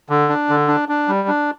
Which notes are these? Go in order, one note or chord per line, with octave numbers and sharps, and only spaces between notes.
D3
D4
D3
D4
D4
G3
D4